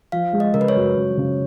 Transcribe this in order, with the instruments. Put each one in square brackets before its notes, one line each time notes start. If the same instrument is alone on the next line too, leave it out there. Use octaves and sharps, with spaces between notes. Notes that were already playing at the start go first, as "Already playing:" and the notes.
[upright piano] F3 [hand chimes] F5
[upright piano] G#3
[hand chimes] D#5
[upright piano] C#3 [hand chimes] A#4
[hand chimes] B4
C#5
[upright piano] F#2
F#2
C#3